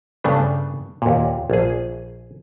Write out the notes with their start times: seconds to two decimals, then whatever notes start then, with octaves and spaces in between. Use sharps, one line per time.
0.24 G2 C#3 A3 B3 D4
1.02 D#2 A#2
1.50 A#1 G#4